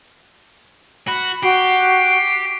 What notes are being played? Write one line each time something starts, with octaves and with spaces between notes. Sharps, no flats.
F#4 B5
F#4 G4 C7